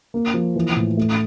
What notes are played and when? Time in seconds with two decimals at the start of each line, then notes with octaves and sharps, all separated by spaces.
0.14 A#3
0.34 F3
0.56 E3
0.76 A2
0.97 A3